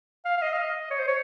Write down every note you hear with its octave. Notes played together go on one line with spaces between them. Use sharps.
F5
F5
D#5
F5
D#5
C#5
C5
C#5